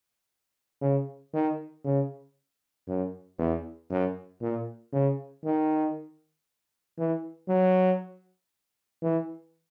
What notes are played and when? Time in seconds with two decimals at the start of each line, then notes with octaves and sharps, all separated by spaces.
0.82 C#3
1.34 D#3
1.85 C#3
2.88 F#2
3.39 E2
3.90 F#2
4.42 A#2
4.93 C#3
5.44 D#3
6.98 E3
7.48 F#3
9.02 E3